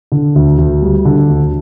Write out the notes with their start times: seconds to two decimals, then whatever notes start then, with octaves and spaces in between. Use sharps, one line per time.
0.12 D3
0.35 D2
0.58 D2
0.82 G3
1.05 D3
1.29 D2